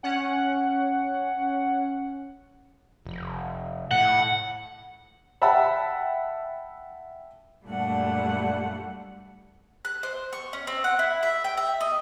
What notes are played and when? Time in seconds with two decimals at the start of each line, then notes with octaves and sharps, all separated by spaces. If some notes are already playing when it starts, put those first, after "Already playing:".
0.03 C#4 F#5
3.06 F1
3.91 A2 F#5
5.41 E5 F#5 G5 A5 B5 E6
7.64 F#2 A#2 G3 A3 D4 F#5
9.85 F#6
10.03 C5
10.33 C#6
10.53 C#4
10.67 C4
10.84 F#5
10.99 E4
11.23 E5
11.44 G5
11.57 E5
11.81 D#5